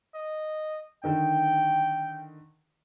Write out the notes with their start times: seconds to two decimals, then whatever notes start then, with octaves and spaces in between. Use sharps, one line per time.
0.15 D#5
1.04 D3 D#3 D#4 G5